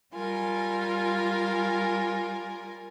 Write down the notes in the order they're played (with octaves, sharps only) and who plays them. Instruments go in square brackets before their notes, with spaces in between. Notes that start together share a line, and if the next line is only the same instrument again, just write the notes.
[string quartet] G3 F4 A#4 G#5